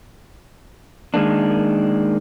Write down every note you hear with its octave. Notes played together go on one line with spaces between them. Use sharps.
D#3 G#3 A#3 D4